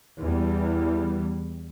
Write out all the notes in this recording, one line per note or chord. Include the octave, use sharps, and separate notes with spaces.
E2 E3 G3